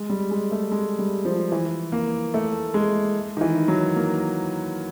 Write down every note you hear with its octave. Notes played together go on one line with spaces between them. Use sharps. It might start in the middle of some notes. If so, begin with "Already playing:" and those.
Already playing: G#3
G3
G#3
A3
G#3
G3
F3
E3
A#3
A3
G#3
D#3
E3
F#3
A#3